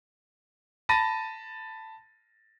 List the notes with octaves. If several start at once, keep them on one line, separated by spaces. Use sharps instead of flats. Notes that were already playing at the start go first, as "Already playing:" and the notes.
A5 B5 A6 A#6 D#7